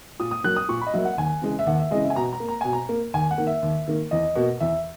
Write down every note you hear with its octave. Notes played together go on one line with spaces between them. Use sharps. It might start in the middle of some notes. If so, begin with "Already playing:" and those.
A#2 D#6
D#6
F#3 A#3 F#6
D#6
A#2 C#6
B5
D#5
F#3 A#3 E5
F#5
D#2 G#5
C#3 E3 G#3
E5
D#2 F#5
E5
C#3 E3 G#3 D#5
E5
G#5
B2 A#5
A#5
A#3
A#5
B2 G#5
A#5
A#3
D#2 G#5
F#5
D#3 A#3
E5
D#2
D#3 A#3
E2 D#5
B2 A#3
E2 E5